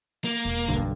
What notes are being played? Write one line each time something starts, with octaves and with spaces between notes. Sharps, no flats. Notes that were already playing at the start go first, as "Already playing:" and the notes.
A#3
E1
B1 G2 D3